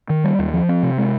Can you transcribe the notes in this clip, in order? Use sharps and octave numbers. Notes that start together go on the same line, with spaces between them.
D#3
G3
D#2
F3
C4
C3
G#3